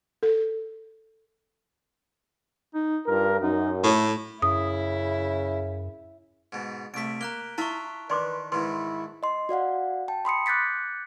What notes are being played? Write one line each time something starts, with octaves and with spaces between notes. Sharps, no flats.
A4
D#4
G2 F4 A#4
F#2 D#4
A2 A3
F#2 C#3 E4 D#6
G#2 B2
C2 A3 B6 D7
A#3 A#5 F#6 G7
E4 F4 E5 A5 C#6
D#3 B4 D5 C6 D6
G#2 D#3 E4 B4 C6
D#5 C6
F#4 D5 F5 F#5
G5 A5
B5 C6 D#6 C#7
D6 F#6 G6 A6 B6 C#7